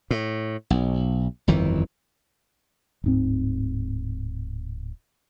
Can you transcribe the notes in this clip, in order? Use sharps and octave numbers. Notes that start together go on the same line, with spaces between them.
A2
B1
G1 F2 D#3 E3
D1 G#2 C4